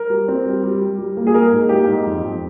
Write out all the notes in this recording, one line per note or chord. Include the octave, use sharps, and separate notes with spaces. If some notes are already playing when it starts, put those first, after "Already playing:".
Already playing: A#4
G3
C4
G3
G3
G3
G3
A#3
G#4
A#3 A#4
G#2
A#3 G4
G#2
F2
F2